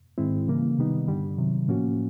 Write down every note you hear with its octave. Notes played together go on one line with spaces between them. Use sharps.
G#2 D#3 G#3 C4 E4
C#3 E3 G3 A#3
C3 D#3 G3 B3 D#4
G2 D3 G3
C3 D#3 F#3
A2 F3 A#3 C#4 F#4